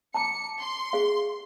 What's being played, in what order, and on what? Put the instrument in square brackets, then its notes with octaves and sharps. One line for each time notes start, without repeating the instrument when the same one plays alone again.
[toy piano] A5 A#5 D6 [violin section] C#7
[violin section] C6
[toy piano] G#4 F5